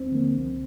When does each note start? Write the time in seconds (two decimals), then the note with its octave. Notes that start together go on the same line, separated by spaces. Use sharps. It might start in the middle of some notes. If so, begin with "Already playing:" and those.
Already playing: D#2 C4
0.12 D3 F3 A#3
0.33 C2